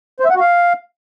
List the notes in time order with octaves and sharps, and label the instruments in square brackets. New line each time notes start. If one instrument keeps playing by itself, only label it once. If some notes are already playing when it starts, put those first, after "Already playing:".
[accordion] C5
E5
F#5
F#4
F5